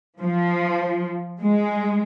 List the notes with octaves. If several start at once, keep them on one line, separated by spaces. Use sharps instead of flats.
F3
G#3